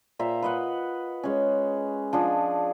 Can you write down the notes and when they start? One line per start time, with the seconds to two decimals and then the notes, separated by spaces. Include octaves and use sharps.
0.19 A#2 C5 E5 A#5
0.42 B4 D#5 F#5
1.23 G#3 C#4
2.13 F3 D4 G#4